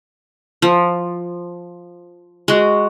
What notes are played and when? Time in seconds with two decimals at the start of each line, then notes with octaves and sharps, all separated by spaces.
0.62 F3
2.48 G#3 F#4